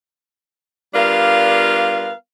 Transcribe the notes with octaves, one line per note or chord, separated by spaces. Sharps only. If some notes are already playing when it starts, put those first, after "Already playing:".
G3 B3 D4 F4 A#4 F5